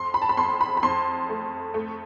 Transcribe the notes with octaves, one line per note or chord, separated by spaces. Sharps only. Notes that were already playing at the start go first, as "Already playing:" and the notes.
Already playing: F2 C6
B5
A5
B5
F2 C6
B5
B5
F2 C6
A3
A3